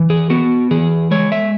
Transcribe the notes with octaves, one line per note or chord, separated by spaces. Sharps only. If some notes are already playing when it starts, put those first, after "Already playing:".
Already playing: E3
G#4
B3 F#4
E3 G#4
G#3 C#5
E5